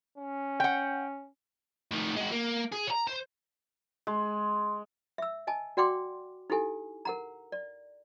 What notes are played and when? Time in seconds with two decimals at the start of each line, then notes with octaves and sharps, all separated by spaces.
0.18 C#4
0.60 F#5 G5
1.91 A2 D#3
2.16 G#3 F#4
2.32 A#3
2.72 G#4
2.87 C#5 A#5
3.07 C5
4.07 G#3
5.18 E5 E6
5.47 D#5 G#5 A5
5.77 F#4 D5 F#5 G5 C6 D6
6.50 D#4 E4 G4 A4 G#5
7.05 A#4 F#5 A#5
7.52 D5